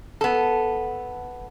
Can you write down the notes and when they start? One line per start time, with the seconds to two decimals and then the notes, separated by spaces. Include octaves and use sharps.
0.21 B3 A4